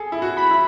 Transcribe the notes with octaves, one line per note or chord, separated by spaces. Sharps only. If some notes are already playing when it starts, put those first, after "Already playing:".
Already playing: G#4 A4
E4
F#4
B5
E4